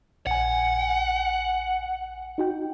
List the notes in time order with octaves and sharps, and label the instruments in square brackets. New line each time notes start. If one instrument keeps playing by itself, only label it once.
[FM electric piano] A#1 G#5 [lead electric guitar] F#5
[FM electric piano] D#4 F#4 G5